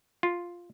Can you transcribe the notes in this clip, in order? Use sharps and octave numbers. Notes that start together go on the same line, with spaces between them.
F4